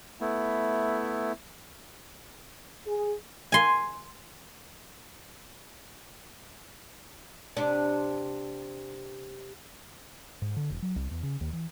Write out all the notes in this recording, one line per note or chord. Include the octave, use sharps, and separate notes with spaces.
A3 B3 E4
G#4
G#5 C6
C3 D4
G#2
D3
E1
F#3
C2
E2
C#3
D#2
E3